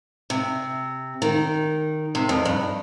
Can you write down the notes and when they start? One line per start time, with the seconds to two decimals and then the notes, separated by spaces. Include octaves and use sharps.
0.30 C3
1.22 D#3
2.15 C3
2.29 F2
2.45 G2